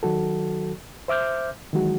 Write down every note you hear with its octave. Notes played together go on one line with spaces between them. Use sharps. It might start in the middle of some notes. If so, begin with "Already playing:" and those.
D#3 F#3 F#4 A4
C5 E5 D6 F6 G6
D#3 E3 F#3 G#3 F#4